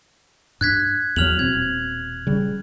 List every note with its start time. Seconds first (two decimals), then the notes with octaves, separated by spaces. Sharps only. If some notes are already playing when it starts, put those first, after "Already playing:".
0.61 G2 F#6 G#6 B6
1.16 E2 F#3 F6 F7 F#7
1.39 D#1 B2 C4 G#6
2.27 C#3 G3